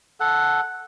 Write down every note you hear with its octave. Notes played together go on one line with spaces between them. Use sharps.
A4 F#5